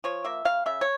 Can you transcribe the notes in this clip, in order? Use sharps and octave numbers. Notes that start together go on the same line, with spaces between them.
F3 C#5
A#3 E5
C#3 F5
C#3 E5
C#5